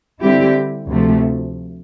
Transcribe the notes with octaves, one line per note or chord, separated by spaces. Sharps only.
D3 G3 C4 E4 G4
D2 C3 F3 A3